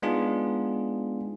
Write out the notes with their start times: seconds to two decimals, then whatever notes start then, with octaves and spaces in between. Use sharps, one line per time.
0.02 G#3 B3 D4 D#4 F4 G#4